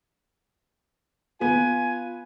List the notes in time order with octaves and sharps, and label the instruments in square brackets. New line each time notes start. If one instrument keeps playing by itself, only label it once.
[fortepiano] B3 [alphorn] F4 [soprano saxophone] G#5